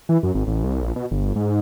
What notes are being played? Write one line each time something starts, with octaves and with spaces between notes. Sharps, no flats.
E3
F#2
G#1
A1
C2
A#1
B2
G1
G#2